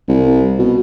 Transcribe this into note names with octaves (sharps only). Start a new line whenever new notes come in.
C2
B2